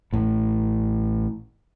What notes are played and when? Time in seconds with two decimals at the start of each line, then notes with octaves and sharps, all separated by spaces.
0.13 A1 A2